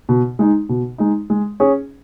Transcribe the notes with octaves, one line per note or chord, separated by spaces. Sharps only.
B2
G#3 D#4
B2
G#3 D#4
G#3
C#4 G#4